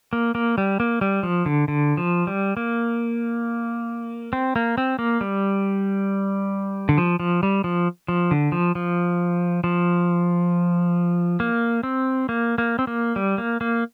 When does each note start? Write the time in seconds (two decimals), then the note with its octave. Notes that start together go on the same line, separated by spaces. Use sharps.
0.13 A#3
0.35 A#3
0.58 G3
0.80 A#3
1.01 G3
1.23 F3
1.46 D3
1.68 D3
1.97 F3
2.27 G3
2.57 A#3
4.33 C4
4.56 A#3
4.78 C4
4.99 A#3
5.21 G3
6.89 D3
6.98 F3
7.20 F3
7.43 G3
7.64 F3
8.08 F3
8.31 D3
8.52 F3
8.75 F3
9.64 F3
11.40 A#3
11.83 C4
12.29 A#3
12.58 A#3
12.79 C4
12.87 A#3
13.16 G3
13.38 A#3
13.61 A#3